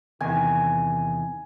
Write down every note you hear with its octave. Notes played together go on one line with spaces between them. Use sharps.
E2 C3 D#3 G#5